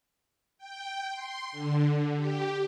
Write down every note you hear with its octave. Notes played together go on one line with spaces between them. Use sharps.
G5
C6
D3
G4